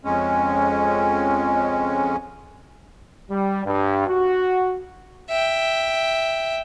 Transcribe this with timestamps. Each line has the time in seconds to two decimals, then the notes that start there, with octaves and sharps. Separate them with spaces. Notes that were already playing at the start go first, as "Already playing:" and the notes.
0.05 F2 G#3 C#4
3.31 G3
3.65 G2
4.07 F#4
5.29 E5 G5